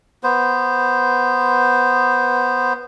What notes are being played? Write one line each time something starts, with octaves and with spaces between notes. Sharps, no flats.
B3 C5